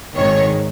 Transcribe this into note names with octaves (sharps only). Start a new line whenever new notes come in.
G#1 G#2 D#3 C#5